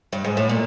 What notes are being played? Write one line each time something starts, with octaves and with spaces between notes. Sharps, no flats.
G2
G#2
A2
A#2